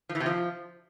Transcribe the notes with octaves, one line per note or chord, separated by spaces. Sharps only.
F3
E3
C3
F3